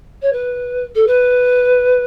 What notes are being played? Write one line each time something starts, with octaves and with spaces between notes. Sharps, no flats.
C#5
B4
A4
B4